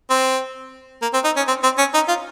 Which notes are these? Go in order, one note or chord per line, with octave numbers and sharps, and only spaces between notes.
C4
A#3
C4
D#4
C#4
C4
C4
C#4
D#4
F4